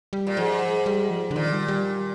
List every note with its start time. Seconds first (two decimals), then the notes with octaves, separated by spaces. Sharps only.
0.13 G3
0.27 A#2
0.37 G#2 F3
0.86 G3
1.10 F3
1.31 D3
1.36 A#2 D#3
1.52 G3
1.68 G3